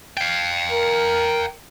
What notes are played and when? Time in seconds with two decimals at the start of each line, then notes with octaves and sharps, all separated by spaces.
0.17 F5 G5
0.72 A#4